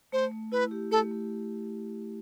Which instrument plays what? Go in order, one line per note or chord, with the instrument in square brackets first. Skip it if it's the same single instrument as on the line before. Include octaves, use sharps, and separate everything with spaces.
[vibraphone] A3 [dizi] C5
[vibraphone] A3
[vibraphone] E4 [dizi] B4
[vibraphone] G4
[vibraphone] A3 [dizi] A4
[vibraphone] A3